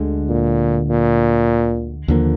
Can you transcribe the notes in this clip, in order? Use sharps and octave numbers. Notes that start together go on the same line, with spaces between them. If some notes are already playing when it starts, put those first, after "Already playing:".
Already playing: D2 D3 G#3
A#2
A#2
D#2 D3 F3 A#3